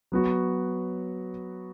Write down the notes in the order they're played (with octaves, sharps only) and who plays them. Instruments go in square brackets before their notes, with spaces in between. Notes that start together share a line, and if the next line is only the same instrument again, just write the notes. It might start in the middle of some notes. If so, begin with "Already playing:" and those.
[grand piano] F#3 B3 F#4